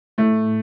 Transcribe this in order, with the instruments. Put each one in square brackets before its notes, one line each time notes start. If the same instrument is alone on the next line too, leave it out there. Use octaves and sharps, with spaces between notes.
[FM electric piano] A2 [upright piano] A3